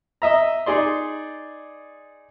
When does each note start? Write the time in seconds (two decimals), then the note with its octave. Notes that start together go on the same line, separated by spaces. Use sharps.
0.22 D#5 E5 A#5
0.66 D#4 G#4 D5 C6